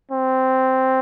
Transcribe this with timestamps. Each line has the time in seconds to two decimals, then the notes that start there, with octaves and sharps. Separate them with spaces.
0.11 C4